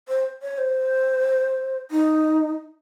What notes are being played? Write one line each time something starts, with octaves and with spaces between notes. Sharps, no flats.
C5
C#5
C5
D#4